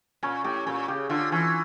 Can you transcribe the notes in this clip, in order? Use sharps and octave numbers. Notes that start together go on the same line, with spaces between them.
A#2 C#4
A2 G4
A#2 C#4
C#3 G4
D3 F4
E3 C#4